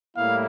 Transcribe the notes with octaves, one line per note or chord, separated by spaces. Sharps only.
A2 G3 A#3 E4 F5